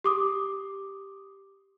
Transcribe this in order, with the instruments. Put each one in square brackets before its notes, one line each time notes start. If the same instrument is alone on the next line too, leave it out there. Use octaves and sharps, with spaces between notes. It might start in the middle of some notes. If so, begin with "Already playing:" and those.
[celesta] G4 D6 D#6